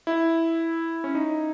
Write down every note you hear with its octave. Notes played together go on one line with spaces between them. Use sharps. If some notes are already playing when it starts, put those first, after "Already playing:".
E4
C#4
D#4